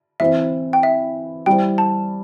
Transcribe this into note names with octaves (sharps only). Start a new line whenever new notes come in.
E3 C4 E4 C5 E5
G5
E5
G3 E4 C5 G5
A5